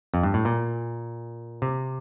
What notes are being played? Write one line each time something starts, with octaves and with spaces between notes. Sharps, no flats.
F2
G2
A2
A#2
C3